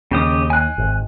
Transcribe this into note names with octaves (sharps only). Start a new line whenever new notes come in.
D#2 C#3 G4 D#6
G#5 F#6
G#1